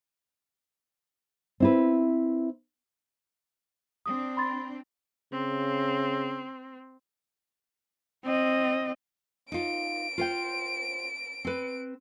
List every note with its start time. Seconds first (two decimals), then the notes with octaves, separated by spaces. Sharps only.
1.60 C4 E4 B4
4.06 C4 D4 D#6
4.37 B5 C6 A6
5.32 C#3 C4
8.24 C4 D#5
9.52 D#4 F4 D7
10.18 F4 C5 G5
11.45 C4 B4